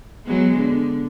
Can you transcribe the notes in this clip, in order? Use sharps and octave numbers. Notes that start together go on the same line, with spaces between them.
F#3 G#3 B3
D3